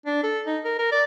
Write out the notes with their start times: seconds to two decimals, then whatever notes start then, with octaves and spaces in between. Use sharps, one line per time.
0.06 D4
0.23 A4
0.46 D#4
0.64 A#4
0.79 A#4
0.92 D5